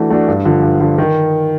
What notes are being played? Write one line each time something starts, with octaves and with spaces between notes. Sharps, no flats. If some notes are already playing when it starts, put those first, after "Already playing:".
Already playing: E3 A3 D4 F#4
A3 D4 F#4
G2
D3 F3
G2
D3 F3
D#3